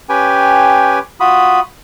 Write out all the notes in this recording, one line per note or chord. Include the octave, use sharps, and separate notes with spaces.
C#4 G4 B4 G5 G#5
F4 F#4 B5 D#6